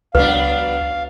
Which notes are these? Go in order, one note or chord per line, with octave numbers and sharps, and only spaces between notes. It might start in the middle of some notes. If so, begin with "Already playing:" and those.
C#2 F#3 B3 D4 B4 F5